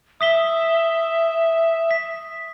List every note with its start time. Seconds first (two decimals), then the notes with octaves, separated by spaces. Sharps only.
0.21 E5 D#6 B6 G7
1.91 B6